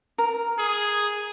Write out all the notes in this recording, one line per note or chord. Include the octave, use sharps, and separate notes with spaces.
A#4
G#4